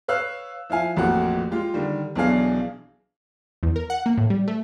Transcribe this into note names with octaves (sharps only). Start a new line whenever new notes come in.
B4 C#5 F5 E6 F#6
F3 E4 F5 G#5
A1 F2 A#2 F#4 G4 F#5
G#3 F4 G4
D3 D#3 G3
B1 B2 E3 D4 G#4 F5
E2
A#4
F#5
A#3
A2
G3
A3